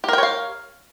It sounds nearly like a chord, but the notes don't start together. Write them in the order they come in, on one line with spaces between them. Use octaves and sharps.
G4 A#4 G5 C#5 F5